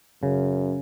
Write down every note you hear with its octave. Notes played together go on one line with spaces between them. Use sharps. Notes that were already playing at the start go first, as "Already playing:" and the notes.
F#2 C#3